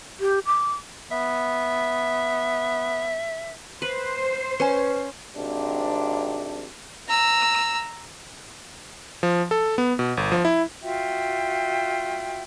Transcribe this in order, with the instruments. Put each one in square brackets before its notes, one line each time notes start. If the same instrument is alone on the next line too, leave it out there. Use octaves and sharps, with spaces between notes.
[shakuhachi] G4
D6
[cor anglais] B3 [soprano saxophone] E5
[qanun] B4 [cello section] C5
[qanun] C#4 [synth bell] B4 G#5
[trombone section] G#1 C3 D4
[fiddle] A#5 E6
[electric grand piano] F3
A4
B3
B2
G1
F3
E4
[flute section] F4 F#4 E5 G5